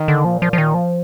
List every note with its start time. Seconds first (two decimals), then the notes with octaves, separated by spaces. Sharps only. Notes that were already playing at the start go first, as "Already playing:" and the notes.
Already playing: D#3
0.08 D3
0.25 A#2 F3
0.42 F3
0.53 F3
0.58 D#3
0.74 F3